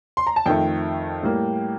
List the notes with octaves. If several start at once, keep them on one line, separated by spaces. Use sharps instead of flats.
C6
A#5
A5
F2 D#3 A3 G5
A2 G3 A#3